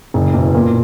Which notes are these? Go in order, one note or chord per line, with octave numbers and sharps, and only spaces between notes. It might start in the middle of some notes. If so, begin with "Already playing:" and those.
F#1
E2 B2
A#2